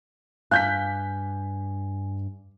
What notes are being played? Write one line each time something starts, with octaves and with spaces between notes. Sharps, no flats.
G2 F5 G#5 F#6 G6 B6